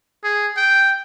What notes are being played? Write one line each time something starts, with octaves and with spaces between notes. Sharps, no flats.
G#4
G5